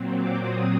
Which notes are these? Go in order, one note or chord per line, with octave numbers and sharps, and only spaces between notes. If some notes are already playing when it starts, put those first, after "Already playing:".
Already playing: A#2 F#3 C4
D6
D#6